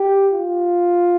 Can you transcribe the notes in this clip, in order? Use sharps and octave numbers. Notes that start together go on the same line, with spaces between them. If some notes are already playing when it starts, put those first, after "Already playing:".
Already playing: G4
F4